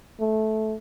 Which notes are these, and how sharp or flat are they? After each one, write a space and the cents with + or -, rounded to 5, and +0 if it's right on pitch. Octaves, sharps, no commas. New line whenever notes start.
A3 -15